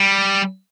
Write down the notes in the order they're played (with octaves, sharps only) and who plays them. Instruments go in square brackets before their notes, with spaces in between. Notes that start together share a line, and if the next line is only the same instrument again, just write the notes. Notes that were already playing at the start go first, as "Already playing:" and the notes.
Already playing: [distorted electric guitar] G3